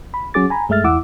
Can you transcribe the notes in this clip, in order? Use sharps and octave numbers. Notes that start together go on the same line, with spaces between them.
B5
F#3 C#4 F#4 G#4 D6 A6
G#5 A#5 B5
G2 G#3 A3 E5 F6 A6
E2 E4 F#5 D6 E6